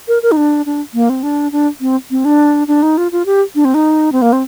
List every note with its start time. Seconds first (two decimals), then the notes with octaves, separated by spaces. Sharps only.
0.08 A#4
0.23 A#4
0.32 D#4
0.37 D4
0.66 D4
0.94 A#3
1.09 C4
1.23 D4
1.52 D4
1.81 C4
2.11 C4
2.25 D4
2.68 D4
2.83 D#4
2.97 F4
3.12 F4
3.26 G4
3.55 D4
3.65 C4
3.74 D#4
4.12 C4
4.22 A#3
4.33 C4